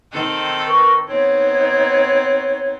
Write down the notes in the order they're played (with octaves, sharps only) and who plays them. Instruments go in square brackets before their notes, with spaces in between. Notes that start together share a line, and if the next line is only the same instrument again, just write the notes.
[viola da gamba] D#3 C4 A4
[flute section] A#4 B4 C#6
[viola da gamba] B3 C4 [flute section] D#4 C#5 G#6